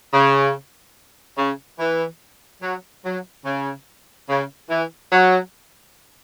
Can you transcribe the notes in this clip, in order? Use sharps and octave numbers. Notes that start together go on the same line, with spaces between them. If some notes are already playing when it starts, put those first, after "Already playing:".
C#3
C#3
E3
F#3
F#3
C#3
C#3
E3
F#3